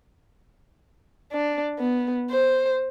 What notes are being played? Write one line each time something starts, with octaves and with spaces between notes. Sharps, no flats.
D4
B3
C5